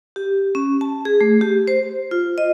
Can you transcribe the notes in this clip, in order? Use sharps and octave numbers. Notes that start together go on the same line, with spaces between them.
G4
C#4
A5
G#4
A3
G4
C5
F4
D#5